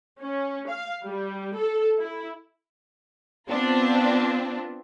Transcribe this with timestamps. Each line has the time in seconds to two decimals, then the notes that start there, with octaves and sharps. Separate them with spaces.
0.21 C#4
0.69 F5
1.04 G3
1.55 A4
2.01 E4
3.49 B3 C4 D4 F4